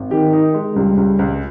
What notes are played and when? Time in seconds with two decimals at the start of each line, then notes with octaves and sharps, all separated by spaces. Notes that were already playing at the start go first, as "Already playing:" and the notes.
Already playing: G#1
0.11 D#3 G4
0.33 D#4
0.54 G#3
0.75 C#2 G3
0.97 C#2
1.19 C#2